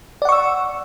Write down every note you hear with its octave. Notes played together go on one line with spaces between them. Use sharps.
D5 F#5 C#6 E6